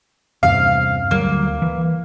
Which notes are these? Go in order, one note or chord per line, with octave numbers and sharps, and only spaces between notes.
E2 G2 C3 F5
D2 F#3 G3 A#3
E3